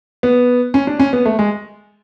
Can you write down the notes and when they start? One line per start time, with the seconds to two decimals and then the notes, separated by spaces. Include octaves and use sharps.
0.23 B3
0.74 C#4
0.87 D4
0.99 C#4
1.13 B3
1.26 A3
1.39 G#3